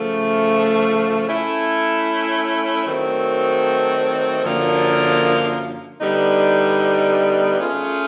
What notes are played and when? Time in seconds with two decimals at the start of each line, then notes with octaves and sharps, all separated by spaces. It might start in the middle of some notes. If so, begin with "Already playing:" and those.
Already playing: C#3 F3 A3
1.28 A3 C#4 E4
2.86 D#3 F#3 A3 C4
4.43 F#2 D3 F3 A#3
6.01 D3 G3 B3 D#4
7.57 A3 C#4 F4 G#4